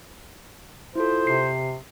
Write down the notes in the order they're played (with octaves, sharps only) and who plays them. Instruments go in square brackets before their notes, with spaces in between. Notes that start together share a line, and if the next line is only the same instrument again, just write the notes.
[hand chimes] E4 F4 A4 [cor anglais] C5
[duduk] C3 [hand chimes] C7